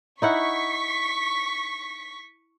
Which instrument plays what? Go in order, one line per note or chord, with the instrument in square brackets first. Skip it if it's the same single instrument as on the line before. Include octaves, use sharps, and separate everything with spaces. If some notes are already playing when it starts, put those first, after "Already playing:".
[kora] D#4 E4 F#5 [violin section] C#6 B6